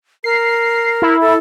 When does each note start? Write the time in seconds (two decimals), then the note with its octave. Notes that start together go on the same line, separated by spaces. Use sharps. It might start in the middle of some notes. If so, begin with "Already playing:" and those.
0.24 A#4 C7
1.02 E4
1.21 A4